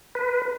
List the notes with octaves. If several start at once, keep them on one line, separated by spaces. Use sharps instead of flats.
B4